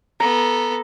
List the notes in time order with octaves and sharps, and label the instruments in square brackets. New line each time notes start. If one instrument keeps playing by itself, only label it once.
[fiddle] B3 A4 [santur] A#5